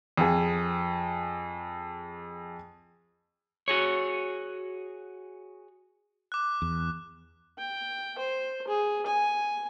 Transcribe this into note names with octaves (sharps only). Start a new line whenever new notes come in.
F2 G#4
F#4 G#4 C#5
D6 F#6
E2
G5
C5
G#4
G#5